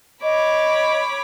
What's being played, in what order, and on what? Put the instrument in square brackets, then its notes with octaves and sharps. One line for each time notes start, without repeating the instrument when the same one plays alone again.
[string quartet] C#5 B5 D6 [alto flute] D#5